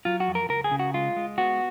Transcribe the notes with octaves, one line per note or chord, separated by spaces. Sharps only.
F#3 F4
F#4
F2
A#4
C#2 A#4
G#4
C#3
F#4
G#3 F4
G#3
B3 F#4